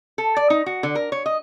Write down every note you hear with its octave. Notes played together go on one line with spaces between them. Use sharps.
A4
D5
D#4
F#4
D3
A#4
C#5
D#5